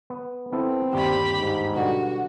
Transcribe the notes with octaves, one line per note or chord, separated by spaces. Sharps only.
B3
B3 C4 E4 A4
G1 D#2 G3 G4 B5
G#2
B2 D3 G3 F#4